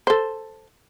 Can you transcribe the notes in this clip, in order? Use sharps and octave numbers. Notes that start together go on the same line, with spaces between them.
A4 C5